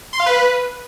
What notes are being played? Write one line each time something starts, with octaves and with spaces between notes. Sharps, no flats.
C6
F5
B4